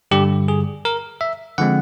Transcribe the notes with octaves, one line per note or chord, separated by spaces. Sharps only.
G2 D3 G3 G4
G#4
A#4
E5
D3 F3 G#3 C4 F#5